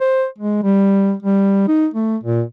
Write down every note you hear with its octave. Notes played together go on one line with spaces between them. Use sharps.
C5
G#3
G3
G3
D#4
A3
A#2